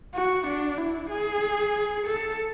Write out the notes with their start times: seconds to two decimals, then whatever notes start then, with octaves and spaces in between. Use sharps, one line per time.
0.14 F#4
0.46 D4
0.77 E4
1.11 G#4
2.06 A4